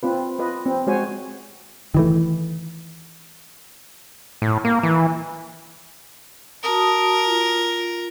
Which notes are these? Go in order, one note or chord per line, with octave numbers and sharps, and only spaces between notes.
C4 F4 B4
F4 B4 D#5
C4
G#3 F#4 C5 C#5 G#5
D#3 E3 A3
A2
A#3
E3
F#4 A#4 A5 D#6
F4